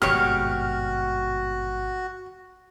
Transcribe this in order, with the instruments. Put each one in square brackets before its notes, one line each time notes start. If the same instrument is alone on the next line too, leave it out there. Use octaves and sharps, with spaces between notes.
[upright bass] G#1 G2 [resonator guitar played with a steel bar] B2 G4 C#5 [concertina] F#4 [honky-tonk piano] F6